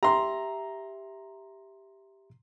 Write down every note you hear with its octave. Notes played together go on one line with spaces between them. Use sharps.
G4 E5 A#5 C6